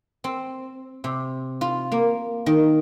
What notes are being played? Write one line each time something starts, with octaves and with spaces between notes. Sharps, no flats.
C4
C3
F4
A#3
D#3